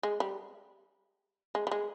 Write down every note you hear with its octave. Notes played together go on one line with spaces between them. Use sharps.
G#3
G3
G#3
G3
G#3